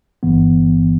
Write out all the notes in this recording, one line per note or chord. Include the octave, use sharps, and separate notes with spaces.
G1 G2 E3 B3